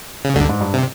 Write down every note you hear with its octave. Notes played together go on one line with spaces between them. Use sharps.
C#3
D2 G2 D3
G#2
G2
C3